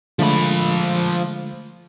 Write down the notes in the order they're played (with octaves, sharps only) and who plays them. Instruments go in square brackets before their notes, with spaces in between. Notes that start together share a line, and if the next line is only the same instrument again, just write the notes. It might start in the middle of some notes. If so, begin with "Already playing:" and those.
[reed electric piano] D3 G#3 A3 [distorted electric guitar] F3 B5